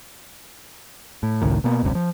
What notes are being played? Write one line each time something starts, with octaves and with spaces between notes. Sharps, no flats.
A2
F#1 C#2 A2 D#3
B2 A#3 B3
F1 C#2 G2 C3
F3